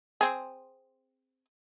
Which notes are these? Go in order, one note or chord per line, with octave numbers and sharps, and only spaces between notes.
C4 G#4